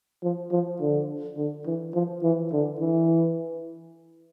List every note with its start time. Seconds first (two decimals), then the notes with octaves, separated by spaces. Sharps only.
0.23 F3
0.52 F3
0.81 D3
1.37 D3
1.66 E3
1.94 F3
2.23 E3
2.53 D3
2.80 E3